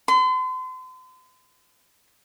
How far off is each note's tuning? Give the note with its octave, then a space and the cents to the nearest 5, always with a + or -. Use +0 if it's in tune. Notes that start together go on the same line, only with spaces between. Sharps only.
C6 -40